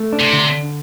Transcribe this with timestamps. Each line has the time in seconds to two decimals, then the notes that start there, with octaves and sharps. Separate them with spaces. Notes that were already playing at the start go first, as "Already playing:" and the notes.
Already playing: A3
0.13 D4
0.20 C3
0.33 D3